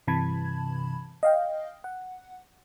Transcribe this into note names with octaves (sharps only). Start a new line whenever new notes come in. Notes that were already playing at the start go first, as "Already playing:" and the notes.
G2 C3 E3 A5 B5 G#6
D#5 F5 G5
F#5